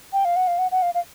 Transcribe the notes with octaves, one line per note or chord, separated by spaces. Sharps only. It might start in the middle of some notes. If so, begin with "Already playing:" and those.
G5
F5
F#5
F5
F#5
F#5
F5
F5